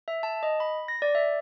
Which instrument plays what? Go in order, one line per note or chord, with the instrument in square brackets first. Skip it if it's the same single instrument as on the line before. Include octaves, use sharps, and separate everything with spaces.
[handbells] E5
A5
D#5
B5
A#6
D5
E5